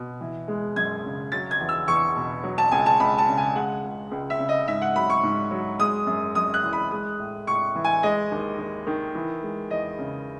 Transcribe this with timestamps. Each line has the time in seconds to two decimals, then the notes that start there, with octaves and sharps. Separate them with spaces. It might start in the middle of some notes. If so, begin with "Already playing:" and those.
Already playing: B2
0.20 E3
0.48 G#3
0.76 F#2 G#6
1.04 C#3
1.32 F#3 A6
1.51 G#6
1.60 E2
1.69 E6
1.88 E2 C#6
2.16 B2
2.44 F#3
2.58 A5
2.71 C#2 G#5
2.86 A5
3.00 C#2 B5
3.18 A5
3.28 C#3
3.37 G#5
3.56 G#3 F#5
3.84 C#2
4.11 C#2
4.30 E5
4.39 C#3
4.49 D#5
4.67 G#2 E5
4.82 F#5
4.96 F#3 B5
5.10 C#6
5.23 G#2
5.51 F#3
5.80 G#3 D#6
6.07 F#2
6.35 F#2 D#6
6.54 F#6
6.63 E3
6.73 B5
6.91 G#3 D#6
7.19 A2
7.47 A2 C#6
7.75 E3
7.84 G#5
8.03 G#3 D#5
8.32 D#2
8.59 D#2
8.87 D#3
9.15 E3
9.43 G#3
9.71 E2 D#5
9.99 C#3